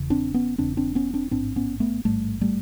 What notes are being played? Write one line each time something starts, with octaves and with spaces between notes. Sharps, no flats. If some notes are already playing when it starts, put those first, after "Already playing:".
Already playing: E1 E2 C#3
C4 D4
B3 C#4
E1 E2 C#3 C4 D4
C4 D4
B3 C#4
C4 D4
A1 G#2 C4 D4
B3 C#4
A3 B3
A1 G#2 G3 A3
G3 A3